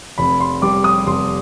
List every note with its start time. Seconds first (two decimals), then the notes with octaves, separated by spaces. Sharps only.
0.18 F1 B5
0.40 C6
0.62 G3 D6
0.84 D#6
1.07 F1 C6